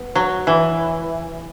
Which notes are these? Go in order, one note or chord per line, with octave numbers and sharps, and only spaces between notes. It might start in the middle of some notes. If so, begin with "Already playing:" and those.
Already playing: B3
F#3
E3